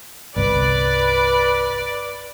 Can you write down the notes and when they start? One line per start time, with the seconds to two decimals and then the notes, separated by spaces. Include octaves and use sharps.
0.36 G1 C2 B4 D5